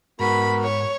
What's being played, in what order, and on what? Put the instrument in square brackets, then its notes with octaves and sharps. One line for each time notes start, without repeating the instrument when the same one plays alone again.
[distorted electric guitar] G#2 [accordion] B3 F#4 A#4 [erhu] B5
[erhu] C#5